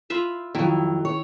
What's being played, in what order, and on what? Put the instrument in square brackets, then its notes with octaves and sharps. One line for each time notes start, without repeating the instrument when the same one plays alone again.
[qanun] F4 B4 E5
[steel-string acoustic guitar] F2 F#3 [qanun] D#3 E4
[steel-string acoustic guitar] C#5